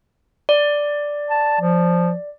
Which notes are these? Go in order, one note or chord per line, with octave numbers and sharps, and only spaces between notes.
D5
A5
F3